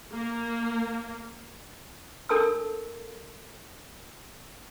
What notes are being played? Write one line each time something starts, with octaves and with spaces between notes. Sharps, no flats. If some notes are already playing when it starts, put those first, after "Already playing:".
A#3
D4 A4 A#4 A5 B5 E6